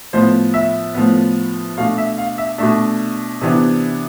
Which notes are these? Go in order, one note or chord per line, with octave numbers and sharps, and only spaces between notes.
A2 F3 B3 C5
E5
A2 F3 B3
B2 A3 D4 F5
E5
F5
E5
B2 A3 D4 E5
C3 E3 B3 D4